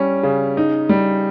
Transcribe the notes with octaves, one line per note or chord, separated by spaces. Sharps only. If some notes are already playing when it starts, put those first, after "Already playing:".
Already playing: G3 C#4
C#3
D#4
G3